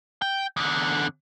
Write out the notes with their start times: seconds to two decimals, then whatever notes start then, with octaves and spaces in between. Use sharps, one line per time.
0.22 G5
0.57 E2 D3